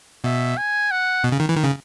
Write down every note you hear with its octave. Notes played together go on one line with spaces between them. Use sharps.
B2 E5
G#5
F#5
B2
C#3
D#3
E3
D#3
C#3